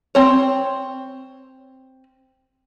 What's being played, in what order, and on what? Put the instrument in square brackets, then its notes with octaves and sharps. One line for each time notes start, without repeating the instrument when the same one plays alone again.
[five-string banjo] C4 C#5